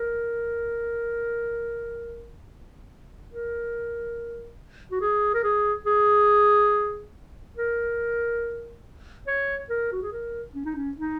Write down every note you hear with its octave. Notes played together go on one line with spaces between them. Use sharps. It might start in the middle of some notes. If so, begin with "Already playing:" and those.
Already playing: A#4
A#4
F#4
G#4
A#4
G#4
G#4
A#4
C#5
A#4
F#4
G#4
A#4
C#4
D#4
C#4
D#4